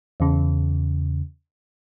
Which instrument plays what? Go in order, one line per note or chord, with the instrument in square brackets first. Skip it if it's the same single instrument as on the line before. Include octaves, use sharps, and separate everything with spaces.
[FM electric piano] E2 C#3